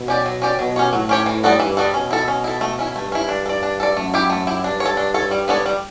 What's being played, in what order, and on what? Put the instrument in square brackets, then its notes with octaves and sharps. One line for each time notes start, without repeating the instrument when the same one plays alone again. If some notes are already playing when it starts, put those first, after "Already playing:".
Already playing: [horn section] B2
[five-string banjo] C#4 G4 D5
F#3
C#4 G4 D5
[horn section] B2 [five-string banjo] F#3
[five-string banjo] C#4 G4 C#5
[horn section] A2 [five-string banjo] F#3
[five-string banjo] C#4 G4 C#5
E3
G3 B3 F#4 A4
[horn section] G2 [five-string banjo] E3
[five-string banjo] G3 B3 F#4 A4
[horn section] B2 [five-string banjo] C#4
[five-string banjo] E4 A4
C#4
E4 A4
A3
C#4 E4
[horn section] G2 [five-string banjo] A3
[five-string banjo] C#4 E4
D4
A4
D5
D4
A4 D5
[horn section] F#2 [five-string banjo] A3
[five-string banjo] E4 G4
A3
E4 G4
[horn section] G2 [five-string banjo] D4
[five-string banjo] C#5
A4
D4
A4 C#5
G3
B3 D4 A4 C#5
G3